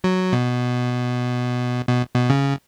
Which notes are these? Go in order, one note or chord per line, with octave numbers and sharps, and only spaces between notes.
F#3
B2
B2
B2
C#3